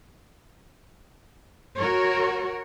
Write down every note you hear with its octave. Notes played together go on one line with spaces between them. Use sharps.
F#4 A#4 C#5